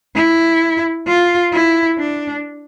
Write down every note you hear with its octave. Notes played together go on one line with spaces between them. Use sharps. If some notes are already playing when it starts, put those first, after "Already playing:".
E4
F4
E4
D4